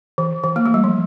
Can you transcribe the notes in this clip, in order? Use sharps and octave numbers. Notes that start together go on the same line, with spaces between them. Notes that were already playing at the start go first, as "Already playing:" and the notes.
E3
E3
A#3
A3
G3
F3